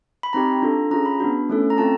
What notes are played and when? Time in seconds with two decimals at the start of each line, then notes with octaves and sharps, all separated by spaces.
0.23 B5
0.33 C4 D#4 G4 A#5
0.62 D4 F4 A4
0.91 C#4 F4 G#4 A#5
1.05 B5
1.20 B3 D4 F#4
1.49 A3 C#4 E4 A4
1.70 A#5
1.78 C4 F4 A4 A5